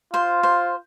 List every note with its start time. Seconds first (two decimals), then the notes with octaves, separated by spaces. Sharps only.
0.13 F4 C5
0.43 C5